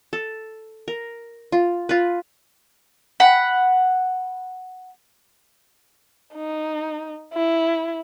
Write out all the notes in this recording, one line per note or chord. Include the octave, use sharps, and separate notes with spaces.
A4
A#4
F4
F4 B4
F#5 B5
D#4
E4